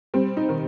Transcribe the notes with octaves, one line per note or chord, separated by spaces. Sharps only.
G3 C4
D#4
D#3